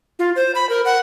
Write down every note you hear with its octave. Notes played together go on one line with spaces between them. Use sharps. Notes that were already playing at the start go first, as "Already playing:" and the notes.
F4
C5
B5
A#4
F#5